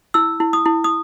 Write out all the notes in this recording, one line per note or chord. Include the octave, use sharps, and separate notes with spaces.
E4 E6
E4
D#6
E4
D#6